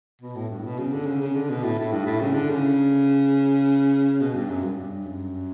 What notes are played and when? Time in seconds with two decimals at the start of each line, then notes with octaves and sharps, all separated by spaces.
0.21 B2
0.35 A2
0.49 G2
0.64 B2
0.78 C#3
0.93 D3
1.06 C#3
1.21 C#3
1.35 D3
1.50 B2
1.63 A2
1.78 A2
1.92 G2
2.06 A2
2.21 C#3
2.34 D3
2.49 C#3
4.21 B2
4.35 G2
4.49 F#2
4.64 G2
4.78 G2
5.06 F#2